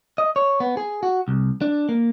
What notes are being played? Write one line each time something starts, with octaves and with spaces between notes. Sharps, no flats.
D#5
C#5
B3
G#4
F#4
C2
D4
A#3